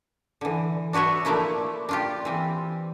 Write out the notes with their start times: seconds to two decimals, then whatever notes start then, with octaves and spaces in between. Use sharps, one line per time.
0.41 D3 E3
0.93 D4 F#4 B4 C#5 E5
1.25 F3 A3 A#3 D4 E4
1.89 D4 F4 G4
2.25 E3 C4